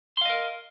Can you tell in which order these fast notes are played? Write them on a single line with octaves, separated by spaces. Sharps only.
C6 F5 D#5 A#4